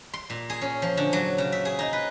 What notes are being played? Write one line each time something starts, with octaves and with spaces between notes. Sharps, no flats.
C6
A#2
G#4
C#4
F3
D3
F#3
C#3
E5
G#4
D#4
B4